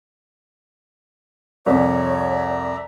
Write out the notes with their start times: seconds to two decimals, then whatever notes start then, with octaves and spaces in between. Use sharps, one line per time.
1.66 C2 F2 C#5 D5 E5 A#5